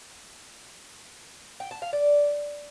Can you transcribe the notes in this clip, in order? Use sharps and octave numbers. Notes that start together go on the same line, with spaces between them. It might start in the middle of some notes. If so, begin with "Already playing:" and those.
G5
A5
F5
D5